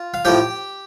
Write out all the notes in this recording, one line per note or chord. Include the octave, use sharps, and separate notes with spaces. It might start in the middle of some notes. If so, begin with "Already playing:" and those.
Already playing: F4
F5
A2 F3 G4 G5